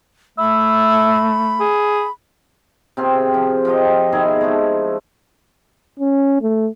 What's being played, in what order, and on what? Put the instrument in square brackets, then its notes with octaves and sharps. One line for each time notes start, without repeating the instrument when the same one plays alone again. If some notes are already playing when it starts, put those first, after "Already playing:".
[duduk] A3 [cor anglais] E5 [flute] B5
[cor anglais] G#4
[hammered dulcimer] C3 C4 F4 G#4
F3
F3 F4 G4 D#5
B2 D#3 E4 G#4
F3 G#3 A3
[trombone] C#4
A3